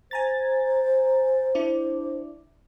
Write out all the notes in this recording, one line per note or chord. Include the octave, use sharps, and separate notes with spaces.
C5 G#5 A#5 A6
D4 E4 D5